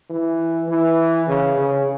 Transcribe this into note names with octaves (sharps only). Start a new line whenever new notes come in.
E3
E3
C#3
C#3